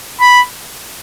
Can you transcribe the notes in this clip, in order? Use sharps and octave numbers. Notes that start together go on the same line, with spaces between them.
B5